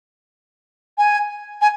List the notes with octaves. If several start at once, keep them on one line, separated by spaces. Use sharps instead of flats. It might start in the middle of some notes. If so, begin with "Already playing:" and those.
G#5
G#5